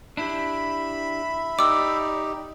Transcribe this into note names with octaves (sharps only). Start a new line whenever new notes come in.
D4 E4 G4 E5 B5
D#4 G4 D5 D6 E6